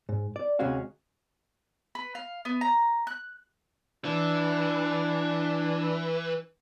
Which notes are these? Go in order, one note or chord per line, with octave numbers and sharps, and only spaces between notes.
G#2
D5
D2 C3 G#3 C#4 F#4 F5
B4
F5
B3
A#5
F#6
E3 D4